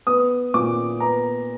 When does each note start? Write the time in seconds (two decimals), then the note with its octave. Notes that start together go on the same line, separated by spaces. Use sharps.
0.07 B3 D#6
0.54 A#2 D6
1.00 B3 A#5